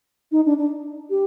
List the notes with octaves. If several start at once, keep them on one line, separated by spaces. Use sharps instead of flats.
D#4
D4
D4
G4